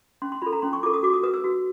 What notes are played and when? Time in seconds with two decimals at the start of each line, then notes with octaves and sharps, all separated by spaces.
0.22 C#4 C6
0.32 C6
0.42 F4 A4 B5
0.53 A#5
0.62 C#4 C6
0.73 C#6
0.83 F4 A4 D6
0.94 D#6
1.03 F#4 D6
1.13 D#6
1.23 B4 D#6
1.34 E6
1.44 F#4